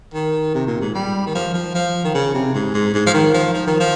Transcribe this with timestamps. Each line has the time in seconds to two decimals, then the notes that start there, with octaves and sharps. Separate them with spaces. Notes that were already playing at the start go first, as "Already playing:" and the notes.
0.14 D#3
0.54 C3
0.67 A#2
0.81 G#2
0.95 G3
1.26 D#3
1.35 F3
1.54 F3
1.75 F3
2.05 D#3
2.15 C#3
2.34 C3
2.55 G#2
2.74 G#2
2.94 G#2
3.06 F3
3.14 D#3
3.34 F3
3.54 F3
3.67 D#3
3.80 F3